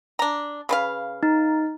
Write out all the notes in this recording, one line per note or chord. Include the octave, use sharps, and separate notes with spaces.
D4 A#5
C#3 B4 F5
D#4